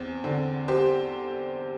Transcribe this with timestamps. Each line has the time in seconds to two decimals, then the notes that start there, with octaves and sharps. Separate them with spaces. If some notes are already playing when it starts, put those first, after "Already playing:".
Already playing: E2 C4
0.24 D3 C4
0.68 G4 C5